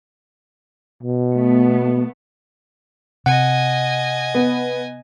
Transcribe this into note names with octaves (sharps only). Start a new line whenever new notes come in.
B2
A3 B3
C3 D#5 F#5 G#5
B3